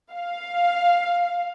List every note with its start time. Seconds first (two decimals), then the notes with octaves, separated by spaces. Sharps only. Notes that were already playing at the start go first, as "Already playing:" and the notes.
0.12 F5